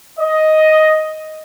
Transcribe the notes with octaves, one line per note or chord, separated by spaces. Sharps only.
D#5